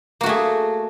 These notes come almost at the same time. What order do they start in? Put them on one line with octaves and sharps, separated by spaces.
A#3 F#4 A3 G#4